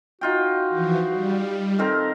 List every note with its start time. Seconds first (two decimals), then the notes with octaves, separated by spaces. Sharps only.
0.21 D#4 F4 F#4 G5
0.69 E3 F3
1.07 G3
1.79 D#3 C4 A4 A#4